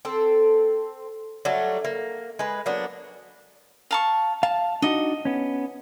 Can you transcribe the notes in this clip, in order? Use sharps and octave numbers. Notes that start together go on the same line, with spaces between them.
C4 A4
F#3 G3 A3 D4
A#3
G#3 B4
F#3 A#3 B3 D4
F5 A5 C#6
F5 A5
D4 D#4 F#4 D#5
B3 C#4